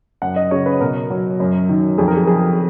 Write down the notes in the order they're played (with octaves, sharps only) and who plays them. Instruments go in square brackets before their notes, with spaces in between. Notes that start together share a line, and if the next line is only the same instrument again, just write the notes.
[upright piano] F#2 F#5
D#5
C#3 C#5
B4
B2 A#4
F#3
F#2
D#3
F2 G#4
A#4
G#4
F3 G#4